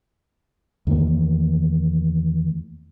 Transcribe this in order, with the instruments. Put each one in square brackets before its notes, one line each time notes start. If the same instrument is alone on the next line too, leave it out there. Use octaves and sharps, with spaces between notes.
[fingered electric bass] E2 D#3 A3 A#3